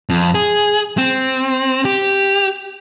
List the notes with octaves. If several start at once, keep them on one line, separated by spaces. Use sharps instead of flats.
F2
G#4
C4
G4